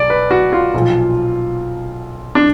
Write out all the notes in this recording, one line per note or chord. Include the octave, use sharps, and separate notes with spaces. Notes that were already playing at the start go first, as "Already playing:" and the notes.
Already playing: B1 D5
B4
F#4
F4
B1 A#2 F3
D4